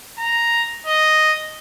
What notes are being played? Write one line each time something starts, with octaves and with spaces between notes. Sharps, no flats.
A#5
D#5